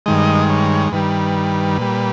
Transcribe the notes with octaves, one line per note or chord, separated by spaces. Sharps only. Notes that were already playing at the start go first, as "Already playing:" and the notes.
G2 D#3 G#3 D#5
C#5
G2 D#3 G3 B4
A#2 G3